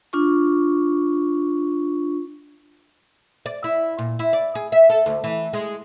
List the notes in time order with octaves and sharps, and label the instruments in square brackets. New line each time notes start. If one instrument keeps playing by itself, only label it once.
[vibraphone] D4 F4 C#6
[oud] D5
E4
A#2
E4
D5
G#4
E5
A4
D2
E3
G#3